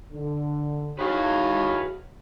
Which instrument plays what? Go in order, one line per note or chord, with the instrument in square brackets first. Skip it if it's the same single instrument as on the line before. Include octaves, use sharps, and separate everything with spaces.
[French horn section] D3
[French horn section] D#2 E4 F#4 [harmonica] D#3 G#4 C#5 [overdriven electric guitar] B4 F5